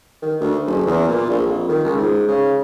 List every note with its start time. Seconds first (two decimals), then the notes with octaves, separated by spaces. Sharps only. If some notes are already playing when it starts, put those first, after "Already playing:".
0.22 D#3
0.40 D2
0.67 F#1
0.87 E2
1.08 A#2
1.29 A#1
1.47 F2
1.68 D#3
1.84 C#2
1.97 G#2
2.28 C#3